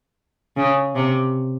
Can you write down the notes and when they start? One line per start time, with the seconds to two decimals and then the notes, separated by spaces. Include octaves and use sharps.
0.57 C#3
0.96 C3